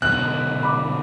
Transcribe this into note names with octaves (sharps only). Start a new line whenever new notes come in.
B2 D3 F#3 F#6
B5 D6